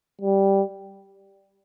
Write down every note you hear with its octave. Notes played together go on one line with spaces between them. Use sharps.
G3